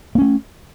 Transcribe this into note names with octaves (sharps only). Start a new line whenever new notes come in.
A3 A#3 C#4